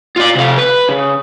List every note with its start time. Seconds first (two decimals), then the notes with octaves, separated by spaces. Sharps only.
0.17 F4 D5
0.37 C3 F5
0.59 B4
0.89 C#3